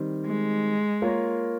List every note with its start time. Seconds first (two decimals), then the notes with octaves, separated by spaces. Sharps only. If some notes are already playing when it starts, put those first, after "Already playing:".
Already playing: D#3 G3 C4
0.26 G#3
1.02 A#3 F4 A#4 C#5